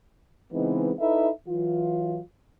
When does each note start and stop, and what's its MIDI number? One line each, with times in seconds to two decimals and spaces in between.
0.53 0.93 49
0.53 0.93 52
0.53 0.93 56
0.53 0.93 59
0.53 0.93 60
0.53 0.93 63
1.00 1.29 63
1.00 1.29 64
1.00 1.29 69
1.00 1.29 71
1.00 1.29 76
1.48 2.20 52
1.48 2.20 54
1.48 2.20 65